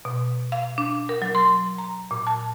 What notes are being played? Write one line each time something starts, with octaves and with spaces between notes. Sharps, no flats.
B2
F5
D4
A#4
F#3
C6
A#5
A#2
A5